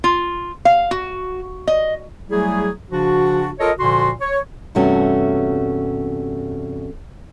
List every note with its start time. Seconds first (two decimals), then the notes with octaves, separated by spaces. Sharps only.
0.04 F4
0.65 F5
0.91 F#4
1.67 D#5
2.30 F#3 G3 A3 E4 G#4
2.91 C#3 F3 D4 F#4
3.59 F4 A4 A#4 C#5 D#5
3.79 A#2 D3 F3 F#4 C6
4.20 C#5
4.75 E2 G2 C3 A3 C#4 F#4